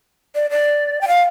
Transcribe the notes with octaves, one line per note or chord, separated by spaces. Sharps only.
D5
D5
G5
F5